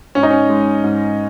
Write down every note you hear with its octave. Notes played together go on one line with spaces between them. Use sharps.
G#2 C#4
D#4
C#4
G#3
G#2